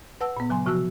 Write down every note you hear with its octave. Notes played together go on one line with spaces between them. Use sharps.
B4 F#5 A5 E6
A#2 B3
C#3 F#3 G#5 C6
C3 F3 F#4 A5 E6 F#6